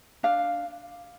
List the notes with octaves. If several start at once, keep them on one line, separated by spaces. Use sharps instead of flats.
D4 F5